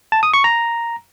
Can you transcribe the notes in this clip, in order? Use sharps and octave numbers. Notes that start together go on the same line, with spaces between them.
A5
D#6
C#6
A#5